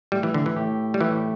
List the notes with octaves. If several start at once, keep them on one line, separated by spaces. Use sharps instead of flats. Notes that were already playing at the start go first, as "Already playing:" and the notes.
A2 G3 A3 G4
E3
D3
E3
A2 A3 G4
G3
A2 E3 A3 G4